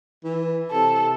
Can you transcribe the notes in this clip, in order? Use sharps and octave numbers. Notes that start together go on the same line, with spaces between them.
E3
C3 A4